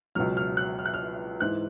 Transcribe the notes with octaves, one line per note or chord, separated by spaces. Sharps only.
C#2 B2 F#3 F6
F6
F#6
F6
F#6
F6
G#2 E3 F#6